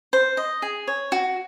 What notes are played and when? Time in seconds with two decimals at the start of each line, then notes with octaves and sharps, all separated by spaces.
0.13 C5
0.37 D#5
0.62 G#4
0.87 C#5
1.12 F#4